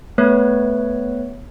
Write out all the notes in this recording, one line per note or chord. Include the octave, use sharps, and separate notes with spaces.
A3 B3 B4 C#5